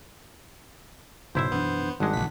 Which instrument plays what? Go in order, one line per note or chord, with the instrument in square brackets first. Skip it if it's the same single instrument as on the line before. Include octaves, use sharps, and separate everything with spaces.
[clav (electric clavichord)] B1 E4 E5 [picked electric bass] G#2 C#3 [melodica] C5
[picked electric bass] F#2 E3 D4 [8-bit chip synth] B3
[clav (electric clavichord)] G#1 G#3 [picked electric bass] G3 [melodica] D4 F#5
[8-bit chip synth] A#1 B6 [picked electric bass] A#2 C#3 E3